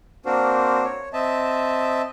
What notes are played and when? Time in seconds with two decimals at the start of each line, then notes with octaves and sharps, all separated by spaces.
0.26 A#3 C4 D4 F#4 A#4 C5
0.85 C#5
1.13 C4 D#5 E5 A5